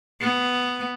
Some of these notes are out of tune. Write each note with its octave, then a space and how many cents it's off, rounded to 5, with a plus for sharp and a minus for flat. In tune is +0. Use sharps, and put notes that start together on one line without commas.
B3 +5